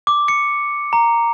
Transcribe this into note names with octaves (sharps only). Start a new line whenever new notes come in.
D6
C#7
A#5